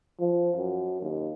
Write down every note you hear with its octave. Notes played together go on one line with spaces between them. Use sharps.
F3
F#2
D#2